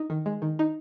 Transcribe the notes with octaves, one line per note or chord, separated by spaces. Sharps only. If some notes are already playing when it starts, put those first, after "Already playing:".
Already playing: D#4
D#3
G#3
D#3
D#4